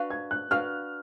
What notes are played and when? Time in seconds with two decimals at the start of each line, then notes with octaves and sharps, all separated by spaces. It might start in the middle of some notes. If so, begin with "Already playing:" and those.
Already playing: D4 F#4 B4 F5
0.10 G#6
0.31 F#6
0.51 D4 F#4 B4 F5 F6